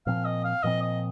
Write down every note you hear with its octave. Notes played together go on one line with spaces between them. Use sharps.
A#2 F3 C4 F5
D#5
F5
A#2 F3 C4 D#5
D#5